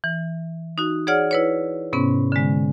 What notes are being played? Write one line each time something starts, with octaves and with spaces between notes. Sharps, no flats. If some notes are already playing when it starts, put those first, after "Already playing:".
E3
D#4 F#4
G#4 C#5 D5 F#5 F6
E4 B4 C#5
G#2 C3 B3 C#4
D3 G#3